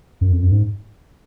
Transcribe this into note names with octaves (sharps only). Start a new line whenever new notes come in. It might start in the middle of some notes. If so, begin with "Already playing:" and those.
F#2
F2
F#2
G#2